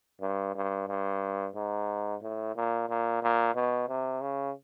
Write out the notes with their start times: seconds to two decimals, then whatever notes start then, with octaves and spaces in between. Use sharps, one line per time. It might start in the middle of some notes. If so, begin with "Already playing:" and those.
0.21 G2
0.55 G2
0.88 G2
1.55 G#2
2.22 A2
2.56 A#2
2.89 A#2
3.22 A#2
3.55 B2
3.88 C3
4.21 C#3